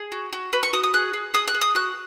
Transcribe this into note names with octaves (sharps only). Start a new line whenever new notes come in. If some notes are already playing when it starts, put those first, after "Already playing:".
Already playing: G#4
F#4
F#4
F#4 B4
C#6
F#4 D#6
D#6
G#4 F#6
G#4
G#4 D#6
F#6
G#4
D#6
F#4 F#6